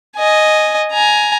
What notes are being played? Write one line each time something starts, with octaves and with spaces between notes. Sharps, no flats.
D#5 G#5
G#5 A#5